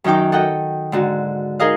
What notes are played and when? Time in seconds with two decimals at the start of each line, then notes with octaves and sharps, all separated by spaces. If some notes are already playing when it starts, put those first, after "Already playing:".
0.04 F#2 D#3 D#4 G5 D6
0.32 A4 D#5 F#5 G5
0.92 G#2 D3 F#4
1.59 D#4 G#4 A#4 D#5 F5